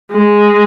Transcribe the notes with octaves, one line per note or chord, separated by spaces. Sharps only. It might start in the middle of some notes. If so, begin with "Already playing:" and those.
G#3